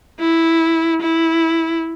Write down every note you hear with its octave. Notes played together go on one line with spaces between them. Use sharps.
E4
E4